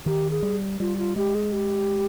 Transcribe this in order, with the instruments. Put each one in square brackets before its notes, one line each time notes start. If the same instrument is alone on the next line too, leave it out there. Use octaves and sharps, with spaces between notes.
[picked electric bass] D#3 [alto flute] G4
[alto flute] G#4
[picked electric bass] G3
[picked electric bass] G3 [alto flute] F4
[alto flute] F4
[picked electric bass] G#3 [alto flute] G4
[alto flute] G#4
G4